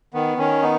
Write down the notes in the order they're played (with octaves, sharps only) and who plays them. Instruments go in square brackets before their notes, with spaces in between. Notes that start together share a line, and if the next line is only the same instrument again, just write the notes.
[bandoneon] D#3 B3
D#3 C#4
B3 D#4